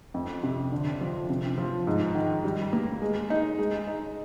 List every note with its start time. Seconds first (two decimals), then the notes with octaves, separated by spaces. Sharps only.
0.14 F2
0.43 C3
0.72 D3
1.01 F3
1.30 C3
1.58 F3
1.87 G#2
2.15 D#3
2.44 G3
2.73 A#3
3.02 G#3
3.30 D#4
3.59 G#3
3.87 D#4